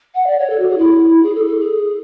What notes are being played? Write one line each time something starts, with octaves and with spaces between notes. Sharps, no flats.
F#5
D5
C#5
A4
F#4
G#4
E4
G#4
A4
A4
G#4